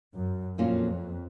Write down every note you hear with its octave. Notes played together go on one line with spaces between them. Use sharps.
F#2
F2 A#2 F#3 A#3 C#4 F4